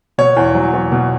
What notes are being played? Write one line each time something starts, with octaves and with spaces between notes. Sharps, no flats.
B2 C#5
E2
F#3
E2
B2